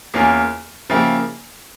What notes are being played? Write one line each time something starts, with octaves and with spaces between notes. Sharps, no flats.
E2 E3 A#3 C#4 F4
C#3 F3 A#3 E4 G4